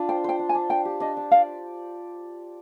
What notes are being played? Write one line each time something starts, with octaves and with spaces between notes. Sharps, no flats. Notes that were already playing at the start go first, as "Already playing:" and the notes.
Already playing: D4 F4
C5 G5
C5 G5
D4
G#5
D4
D4 G5
G4
D4 D#5
D4
D5 F5